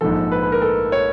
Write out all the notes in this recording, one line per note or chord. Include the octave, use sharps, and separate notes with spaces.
A#1 G#2 F3 A4
B4
B4
A#4
A4
C#5